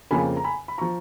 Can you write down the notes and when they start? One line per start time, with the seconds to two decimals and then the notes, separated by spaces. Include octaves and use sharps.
0.11 F2 C#3 F3 A#3 G#5 B5
0.37 A#5
0.44 G#5 B5
0.68 B5
0.78 F3 A#5 C#6